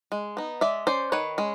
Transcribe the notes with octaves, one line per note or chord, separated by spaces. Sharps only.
G#3
B3 D#4
G#3 D5 E5
C#4 C5 D5
D#3 B4 C#5
G#3 C#4